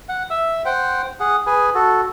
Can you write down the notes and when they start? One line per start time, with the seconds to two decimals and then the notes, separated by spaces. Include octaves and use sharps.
0.09 F#5
0.30 E5 E6
0.65 C5 F#5 G5
1.20 G#4 F#5
1.46 G#4 B4 G#5
1.74 F#4 A4